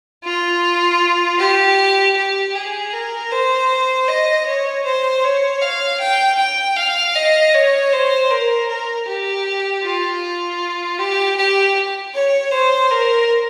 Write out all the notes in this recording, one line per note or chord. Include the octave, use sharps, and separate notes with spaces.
F4
G4
G4
G#4
A#4
C5
D#5
C#5
C5
C#5
F5
G5
G5
F5
D#5
C#5
C5
A#4
A#4
G4
F4
G4
G4
C#5
C5
A#4